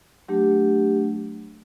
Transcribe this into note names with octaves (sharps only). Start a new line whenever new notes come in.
F#3 A3 D4 G4